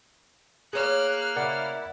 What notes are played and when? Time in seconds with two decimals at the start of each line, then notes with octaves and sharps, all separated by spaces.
0.73 A#3 G#4 C#5 D5 F6 F#6
1.36 C#3 E4 A#4 D5 F#5